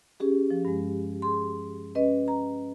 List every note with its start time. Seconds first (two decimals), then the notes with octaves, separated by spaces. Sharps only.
0.20 C#4 G4 G#4
0.50 F3
0.65 G2 G#3
1.22 G#4 C6
1.95 C#4 B4 D#5
2.28 A#5